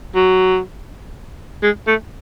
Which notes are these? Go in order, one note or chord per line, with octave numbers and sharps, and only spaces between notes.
F#3
G#3
A3